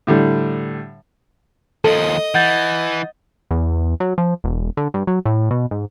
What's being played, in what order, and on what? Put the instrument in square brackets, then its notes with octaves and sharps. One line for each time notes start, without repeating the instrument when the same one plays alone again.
[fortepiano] A2 D3 G3
[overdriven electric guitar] D#2 F3 [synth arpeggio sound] A4 [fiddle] D#5
[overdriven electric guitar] E3 [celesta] F#5 G6 A6
[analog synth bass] E2
F#3
F3
E1
D3
G2
F#3
A2
B2
G#2